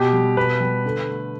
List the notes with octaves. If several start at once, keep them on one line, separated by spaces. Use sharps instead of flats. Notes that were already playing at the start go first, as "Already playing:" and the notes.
Already playing: B2 G4
G3
B2 B4
G3
D3
A3